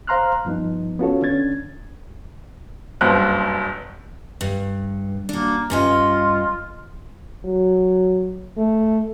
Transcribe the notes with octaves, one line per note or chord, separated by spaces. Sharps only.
C5 F5 A#5 C6 F6 F#6
G2 F3 B3 D#4
B3 C#4 F4 F#4 A4 C#5
D3 C#4 D4 G#6 A6
F#1 G2 B2 C5 F#6
G2
A#3 D4 F#4
G2 C#4 F4 D#5
F#3
A3